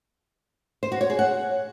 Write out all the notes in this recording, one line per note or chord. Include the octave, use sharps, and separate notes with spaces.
C5
F#4
C#5
G#4
F#5